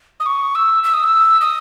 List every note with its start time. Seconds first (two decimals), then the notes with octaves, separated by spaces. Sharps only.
0.20 D#6
0.26 C#6
0.55 E6
0.84 E6
0.94 D#6
1.04 E6
1.41 D#6